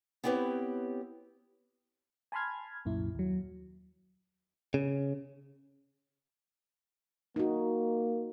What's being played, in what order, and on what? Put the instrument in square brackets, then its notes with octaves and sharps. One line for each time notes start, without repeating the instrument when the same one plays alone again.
[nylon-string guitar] B3 C4 E4 G4 B4 C#5
[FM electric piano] G#5 A5 B5 C6 F6 G#6
C2 F#2 A#2 E4
D#2 F#3
[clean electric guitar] C#3
[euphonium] A#3 [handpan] D#4 F#4